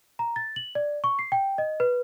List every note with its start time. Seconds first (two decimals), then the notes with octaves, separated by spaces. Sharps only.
0.19 A#5
0.36 A6
0.56 F#7
0.75 D5
1.04 C#6
1.19 C7
1.32 G5
1.58 D#5
1.80 B4